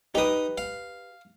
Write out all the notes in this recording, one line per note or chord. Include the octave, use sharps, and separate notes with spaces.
D#4 G4 B4 D#6
F5